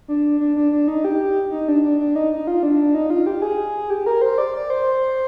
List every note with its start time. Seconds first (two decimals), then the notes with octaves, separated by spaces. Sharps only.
0.08 D4
0.40 D4
0.56 D4
0.72 D4
0.88 D#4
1.05 G4
1.51 D#4
1.68 D4
1.83 D4
1.99 D4
2.16 D#4
2.32 D#4
2.47 F4
2.63 D4
2.95 D#4
3.10 F4
3.26 G4
3.42 G#4
3.90 G4
4.06 A#4
4.22 C5
4.38 D5
4.54 D5
4.70 C5